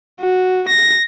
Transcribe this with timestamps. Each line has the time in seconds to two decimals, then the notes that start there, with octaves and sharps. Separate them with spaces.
0.21 F#4
0.69 A#6